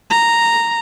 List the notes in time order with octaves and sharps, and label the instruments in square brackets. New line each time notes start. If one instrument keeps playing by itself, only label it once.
[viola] A#5